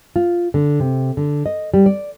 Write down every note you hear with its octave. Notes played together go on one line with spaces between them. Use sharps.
F4
D3
C3
D3
D#5
G3
D5